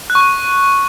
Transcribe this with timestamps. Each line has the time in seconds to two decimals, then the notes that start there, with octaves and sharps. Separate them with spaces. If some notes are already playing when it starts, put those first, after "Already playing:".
0.10 F#6
0.15 C#6
0.21 F#6